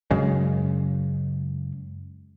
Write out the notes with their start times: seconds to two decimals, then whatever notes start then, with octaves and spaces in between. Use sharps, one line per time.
0.11 F#2 C#3 G#3